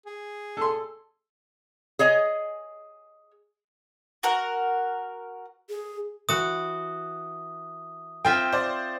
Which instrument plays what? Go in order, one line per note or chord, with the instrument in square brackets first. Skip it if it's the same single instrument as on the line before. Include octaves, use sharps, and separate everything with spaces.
[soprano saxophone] G#4
[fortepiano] A4 C6
[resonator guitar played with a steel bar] G#4 C#5 D#5 G#5
[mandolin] F#4 A#4 F#5
[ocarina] G#4
[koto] E3 F#4 [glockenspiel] D#6
[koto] C4 F4 E5 [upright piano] G5
[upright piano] C5 D5